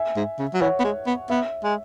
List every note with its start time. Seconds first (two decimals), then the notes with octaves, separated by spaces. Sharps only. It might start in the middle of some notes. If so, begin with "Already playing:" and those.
Already playing: E5 G#5
0.16 G#2
0.39 C#3
0.54 F#3
0.61 E3 C#5 F#5
0.80 B3
0.84 G#3
1.07 B3
1.30 B3 E5
1.64 G#3